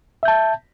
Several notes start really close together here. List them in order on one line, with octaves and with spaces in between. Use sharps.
E5 G6 A5